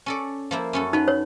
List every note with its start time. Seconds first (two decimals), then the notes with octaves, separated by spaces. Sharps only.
0.06 C#4 A4 D5
0.51 F3 A#3 E4
0.73 F#2 C#4 A4
0.93 F#3 D#4 B4
1.08 C#5